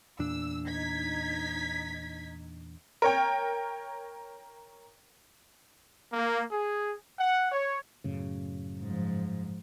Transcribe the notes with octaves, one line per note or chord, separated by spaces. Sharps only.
E2 A#2 D4 E6
D#4 G#6 B6
A#4 C#5 G5
A#3
G#4
F#5
C#5
F#2 A2 C#3
G#2 F3